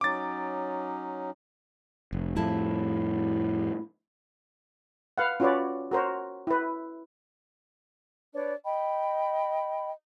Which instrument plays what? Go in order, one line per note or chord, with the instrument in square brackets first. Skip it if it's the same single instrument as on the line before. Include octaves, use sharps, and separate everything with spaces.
[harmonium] F#3 C#4 D#4 [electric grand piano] D6 A6
[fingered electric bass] F1
[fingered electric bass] F2 A2 [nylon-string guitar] F3 E4 A5
[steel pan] B4 F5 F#5
C#4 F4 F#4 B4 C#5 D5
F#4 A#4 C5 C#5
E4 B4
[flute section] D4 B4 C#5 D5
D#5 G5 B5